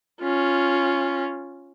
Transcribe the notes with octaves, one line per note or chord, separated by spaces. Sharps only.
C#4 F4